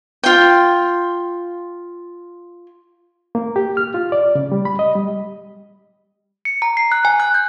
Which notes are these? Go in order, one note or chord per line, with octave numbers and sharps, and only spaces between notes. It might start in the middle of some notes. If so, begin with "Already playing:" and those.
F4 G5
A#3
G4
F6
F4
D5
C#3
G3
B5
D#5
G3
C#7
A#5
C7
F#6
G#5
F#6
G6